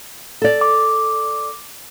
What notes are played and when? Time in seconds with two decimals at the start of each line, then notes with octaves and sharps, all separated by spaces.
0.42 A4 D5
0.61 D6